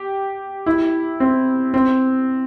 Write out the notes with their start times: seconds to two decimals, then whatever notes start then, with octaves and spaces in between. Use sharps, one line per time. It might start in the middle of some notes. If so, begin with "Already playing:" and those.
Already playing: G4
0.66 E4
1.20 C4
1.74 C4